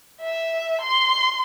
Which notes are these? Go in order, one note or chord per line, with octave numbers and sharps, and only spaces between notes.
E5
C6